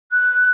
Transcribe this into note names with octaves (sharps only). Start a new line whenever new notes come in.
F#6